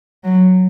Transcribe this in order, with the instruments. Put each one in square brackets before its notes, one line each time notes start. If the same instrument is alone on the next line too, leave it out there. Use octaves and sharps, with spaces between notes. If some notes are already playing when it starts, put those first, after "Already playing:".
[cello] F#3